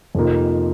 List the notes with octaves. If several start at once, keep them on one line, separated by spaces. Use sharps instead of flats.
F2 C3 F3 A#3 D#4